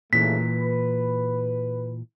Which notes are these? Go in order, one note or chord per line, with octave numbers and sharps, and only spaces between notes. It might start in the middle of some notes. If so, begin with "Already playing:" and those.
D#2 A#2 C#3 E3 A3 B6
B4